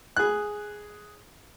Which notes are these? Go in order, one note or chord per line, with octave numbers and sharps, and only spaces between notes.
G#4 F#6